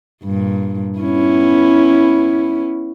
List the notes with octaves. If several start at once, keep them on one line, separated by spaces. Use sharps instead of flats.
G2 A#2
B3 C#4 E4